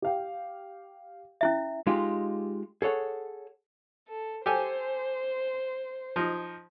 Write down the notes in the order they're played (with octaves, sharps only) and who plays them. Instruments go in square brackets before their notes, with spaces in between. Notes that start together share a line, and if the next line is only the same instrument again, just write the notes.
[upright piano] G4 F5 G5
[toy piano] C#4 E4 E5
[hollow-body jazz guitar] G#3 D#4 F4 G4 G#4
G#4 A4 C#5 F#5
[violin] A4
[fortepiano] G4 A4 G#5 [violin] C5
[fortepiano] F3 D#4